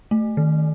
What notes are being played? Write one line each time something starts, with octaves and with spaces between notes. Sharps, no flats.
A3
D#3